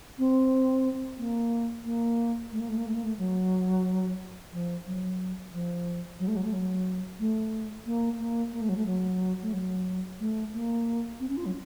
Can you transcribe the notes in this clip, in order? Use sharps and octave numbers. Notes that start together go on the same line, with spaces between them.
C4
A#3
A#3
A3
A#3
A3
A#3
A3
A#3
A3
F#3
F3
F#3
F3
F#3
A3
F#3
A3
F#3
A3
A#3
A#3
A#3
A3
F#3
A3
F#3
A3
F#3
A3
A#3
C4
C#4
F4
F#3